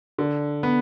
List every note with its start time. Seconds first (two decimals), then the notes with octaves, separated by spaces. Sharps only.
0.18 D3
0.63 B3